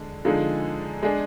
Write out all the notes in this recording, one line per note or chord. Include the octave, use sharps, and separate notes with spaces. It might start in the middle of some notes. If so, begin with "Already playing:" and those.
Already playing: D3 G#3
D3 F3 G#3 D#4 G#4
G#3 D4 G#4